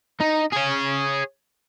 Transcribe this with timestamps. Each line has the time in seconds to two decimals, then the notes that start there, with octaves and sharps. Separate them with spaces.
0.20 D#4
0.52 G#4 C#5